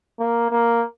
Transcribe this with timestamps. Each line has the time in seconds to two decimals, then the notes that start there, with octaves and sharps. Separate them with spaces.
0.19 A#3
0.51 A#3